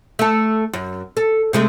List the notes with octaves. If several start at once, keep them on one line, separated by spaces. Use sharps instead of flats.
A3 A4
F#2
A4
C3 G#3 A3